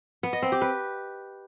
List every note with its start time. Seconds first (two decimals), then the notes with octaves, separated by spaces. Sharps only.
0.23 B3
0.33 D#5
0.42 C4
0.52 G4
0.62 B4